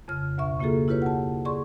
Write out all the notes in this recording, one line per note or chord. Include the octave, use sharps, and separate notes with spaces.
F2 C#3 F6
D2 B2 E5 C#6
C#3 A#3 F4 F#4 G#4 A4
E4 F4 G4 B4 C#5
F#5 A5
G#4 D5 C6 C#6